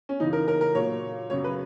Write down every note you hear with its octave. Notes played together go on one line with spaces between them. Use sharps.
C#4
F#2 C#3 E3 D#4
A#4
A#4
A#4
A#2 F#3 C#5
F#2 C#3 F#3 C#5
B4